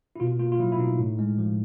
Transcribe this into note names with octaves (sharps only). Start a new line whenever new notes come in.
E4
B2 F4
A#3 F4
F4
F#3 E4
E4
B2 D#4
A2
G#3
F3